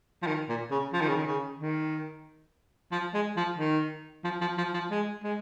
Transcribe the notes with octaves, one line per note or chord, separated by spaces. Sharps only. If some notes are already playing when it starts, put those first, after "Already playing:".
F3
D#3
A#2
C#3
F3
D#3
C#3
D#3
C#3
D#3
F3
G#3
F3
D#3
F3
F3
F3
F3
G#3
G#3